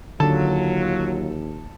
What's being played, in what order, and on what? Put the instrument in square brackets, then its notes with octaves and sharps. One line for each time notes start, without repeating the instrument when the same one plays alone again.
[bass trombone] D#2 [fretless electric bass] D3 [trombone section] F#3 F4 [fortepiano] A4 A5